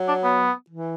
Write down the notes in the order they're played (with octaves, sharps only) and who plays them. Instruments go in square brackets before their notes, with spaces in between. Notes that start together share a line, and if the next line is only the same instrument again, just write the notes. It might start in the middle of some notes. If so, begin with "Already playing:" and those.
Already playing: [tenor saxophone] F#3
[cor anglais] D4
B3
[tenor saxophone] E3